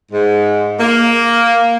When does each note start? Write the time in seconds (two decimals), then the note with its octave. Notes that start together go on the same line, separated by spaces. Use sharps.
0.12 G#2
0.80 A#3